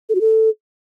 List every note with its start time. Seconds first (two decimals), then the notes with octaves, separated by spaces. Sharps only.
0.09 A4
0.15 F#4
0.21 A4